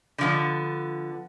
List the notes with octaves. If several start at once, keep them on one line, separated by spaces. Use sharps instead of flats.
D3 F3 B3